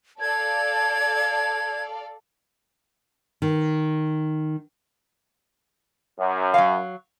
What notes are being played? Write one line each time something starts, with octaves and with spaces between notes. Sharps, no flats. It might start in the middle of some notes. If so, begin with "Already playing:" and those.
A4 D5 F5 G#6
D#3
F#2
F#3 F5